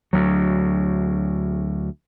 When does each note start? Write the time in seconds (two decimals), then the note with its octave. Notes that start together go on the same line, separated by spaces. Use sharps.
0.13 D2 F#3